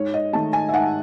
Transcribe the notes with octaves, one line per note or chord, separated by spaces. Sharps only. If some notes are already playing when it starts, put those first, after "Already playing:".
Already playing: G#2 C#5
D#5
D#3 A3 A5
G#5
E5
G#2 F#5